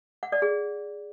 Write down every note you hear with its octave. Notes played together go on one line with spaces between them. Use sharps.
F#5
D5
G#4